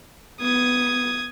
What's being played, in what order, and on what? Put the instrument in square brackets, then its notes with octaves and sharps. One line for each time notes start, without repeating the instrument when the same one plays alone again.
[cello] B3 [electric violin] D#6 G#6